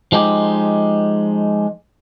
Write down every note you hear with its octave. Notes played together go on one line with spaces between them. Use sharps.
F3 G#3 D#4 G4